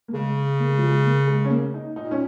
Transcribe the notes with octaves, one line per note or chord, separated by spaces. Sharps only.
A#3
C#3 G#3
A#3
G#3
F3
G#3
A#3
G#3
C#4
A#3
D#4
A#2 D#4
C#4